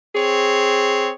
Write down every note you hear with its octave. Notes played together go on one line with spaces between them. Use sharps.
C4 G#4 C#5